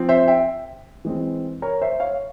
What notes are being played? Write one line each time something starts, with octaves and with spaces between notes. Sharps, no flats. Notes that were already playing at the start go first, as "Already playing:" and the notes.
Already playing: F3 C4
C5 E5
E5 G5
E3 G#3 C4
A#4 C#5
C5 E5
C#5 F5